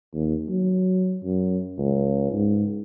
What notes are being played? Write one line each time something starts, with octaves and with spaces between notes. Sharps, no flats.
D#2
F#3
F#2
C#2
G#2